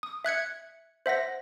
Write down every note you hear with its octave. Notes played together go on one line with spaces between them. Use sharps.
D#6
E5 F#6 G#6 C#7
C5 E5 F#5 A#6